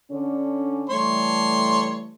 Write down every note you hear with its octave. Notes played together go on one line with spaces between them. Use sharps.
D3 C#4
E3 G3 A3 C#5 C6